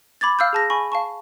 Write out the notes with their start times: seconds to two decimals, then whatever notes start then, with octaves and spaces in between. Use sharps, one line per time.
0.21 B5 D6 G#6 A6
0.39 F5 E6 F6 G6
0.53 G#4 A5 A#6
0.70 G#5 B5 C#6
0.92 F5 A5 C#6